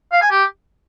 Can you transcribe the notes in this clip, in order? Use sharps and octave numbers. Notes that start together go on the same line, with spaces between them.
F5
G#5
G4